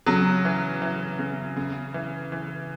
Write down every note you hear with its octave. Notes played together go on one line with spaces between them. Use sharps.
C#3 F#3
E3
E3
C#3
C#3
E3
E3